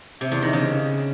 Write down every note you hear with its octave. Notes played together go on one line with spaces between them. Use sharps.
C3
E2
D#3
C#3